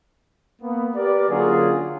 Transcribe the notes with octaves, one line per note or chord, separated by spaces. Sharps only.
A#3 B3
G4 A#4 B4 D5
D3 F#3 A#3 C#4 F4 G#4